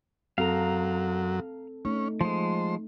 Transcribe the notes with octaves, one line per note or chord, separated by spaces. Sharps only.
F#2 F#3 C4 A4 F5 A#5
A3 C#4 D#4
F3 G#3 C5